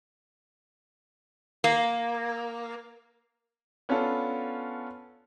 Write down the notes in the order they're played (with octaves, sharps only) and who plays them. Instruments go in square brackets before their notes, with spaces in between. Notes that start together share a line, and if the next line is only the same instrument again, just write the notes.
[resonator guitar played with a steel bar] A#3
[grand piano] B3 C#4 D4 F4 A4